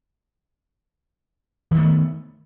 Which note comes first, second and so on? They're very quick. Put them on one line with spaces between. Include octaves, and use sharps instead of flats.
E3 D#3 A3 B3